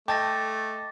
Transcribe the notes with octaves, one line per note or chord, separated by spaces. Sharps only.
A3 D#5 G5 A5 D6 A6 A#6